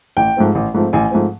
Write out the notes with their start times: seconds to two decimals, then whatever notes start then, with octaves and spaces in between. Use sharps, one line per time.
0.17 A1 G5
0.37 G#2 F3 A3 C4
0.55 A1
0.74 G#2 F3 A3 C4
0.93 A1 G#5
1.11 G#2 F3 A3 C4